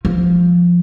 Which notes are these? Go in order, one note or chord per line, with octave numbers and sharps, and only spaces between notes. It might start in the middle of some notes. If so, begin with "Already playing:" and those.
F3